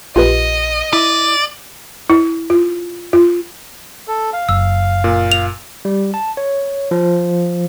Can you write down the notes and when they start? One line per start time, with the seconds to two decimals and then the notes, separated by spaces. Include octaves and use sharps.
0.16 A#1 F4 G4 B4 D#5
0.93 E4 D5
2.10 E4
2.50 F4
3.13 F4
4.08 A4
4.33 F5
4.49 F#1 E6
5.04 A#2
5.32 F7
5.85 G3
6.14 A5
6.37 C#5
6.91 F3